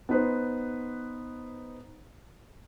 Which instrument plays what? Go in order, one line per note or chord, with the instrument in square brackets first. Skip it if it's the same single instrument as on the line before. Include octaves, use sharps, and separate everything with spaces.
[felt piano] B3 D#4 B4 C5